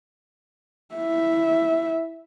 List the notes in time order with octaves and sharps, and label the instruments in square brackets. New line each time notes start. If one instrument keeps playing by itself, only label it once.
[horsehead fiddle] E4 E5